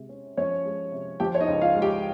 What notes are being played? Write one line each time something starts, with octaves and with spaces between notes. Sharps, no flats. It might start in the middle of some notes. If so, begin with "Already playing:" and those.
Already playing: C3 G#3
C#4
F3 C#4 C#5
G#3
C3
F3 G4 G5
C#5
D#4 D#5
C#2
F4 F5
G#3
G4 G5